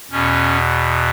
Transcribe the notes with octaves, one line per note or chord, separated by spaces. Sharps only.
E2 B2 C#4